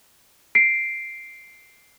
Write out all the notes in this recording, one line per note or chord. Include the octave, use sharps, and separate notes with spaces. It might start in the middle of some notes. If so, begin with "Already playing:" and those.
C7 D7